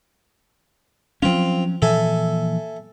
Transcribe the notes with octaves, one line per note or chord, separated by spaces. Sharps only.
F3 F#3 C4 C#4 F4
A#2 E3 F3 A4 E5 G#5